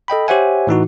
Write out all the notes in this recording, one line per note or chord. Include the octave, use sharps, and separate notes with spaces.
A4 D#5 G5 B5
G4 C5 C#5 E5 F#5 G#5
A2 E3 D#4 F#4